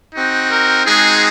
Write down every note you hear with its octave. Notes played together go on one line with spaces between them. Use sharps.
C4 D#4 F#4
A#4
G#3 C4 D#4 F#4 G#4